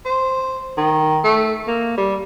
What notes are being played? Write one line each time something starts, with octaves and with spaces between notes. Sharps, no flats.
C5
D#3
A3
A#3
G3